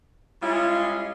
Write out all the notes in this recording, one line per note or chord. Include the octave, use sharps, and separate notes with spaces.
G3 G#3 C#4 E4 F4